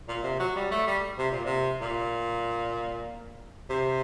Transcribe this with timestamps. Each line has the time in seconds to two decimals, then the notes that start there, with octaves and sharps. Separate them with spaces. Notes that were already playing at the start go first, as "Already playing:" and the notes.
0.08 A#2
0.24 C3
0.39 F#3
0.56 G3
0.71 A3
0.87 G3
1.18 C3
1.31 A#2
1.45 C3
1.81 A#2
3.70 C3